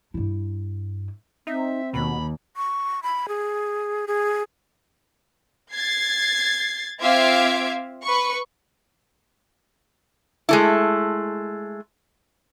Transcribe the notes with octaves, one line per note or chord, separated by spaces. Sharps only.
G2 E4
C4 D#4 E5
D#2 B2 B5
C#6
B5
G#4
G#4
G#6 A6 C7
C4 F4 E5 F5 D6 G#6
B4 C#6
G#3 A3 E4